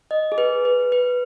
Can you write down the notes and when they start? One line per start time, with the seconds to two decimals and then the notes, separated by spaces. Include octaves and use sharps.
0.11 D#5
0.32 G#4
0.38 B4
0.65 B4
0.92 B4